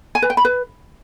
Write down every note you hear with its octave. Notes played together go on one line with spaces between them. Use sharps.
G#5
B4
G5
B5
B4